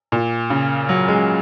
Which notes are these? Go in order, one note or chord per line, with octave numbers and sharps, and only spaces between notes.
A#2
C#3
F#3
G#3